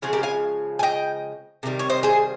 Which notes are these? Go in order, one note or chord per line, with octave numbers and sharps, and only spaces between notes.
C#3 F3 G#3 F4 G#4
G4 A#4
F5 G#5
G#5
D#5 G5
C3 D#3 G3
C#5
C5 D#5
G#4 C5